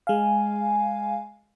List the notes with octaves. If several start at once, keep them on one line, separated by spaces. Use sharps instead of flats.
G#3 F5 G#5